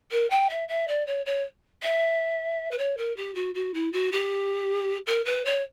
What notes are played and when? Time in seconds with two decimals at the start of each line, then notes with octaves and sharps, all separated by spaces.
0.11 A#4
0.30 G5
0.49 E5
0.68 E5
0.88 D5
1.06 C#5
1.25 C#5
1.82 E5
2.71 B4
2.78 C#5
2.97 A#4
3.16 G4
3.35 F#4
3.54 F#4
3.74 E4
3.92 F#4
4.12 G4
5.06 A#4
5.25 B4
5.45 C#5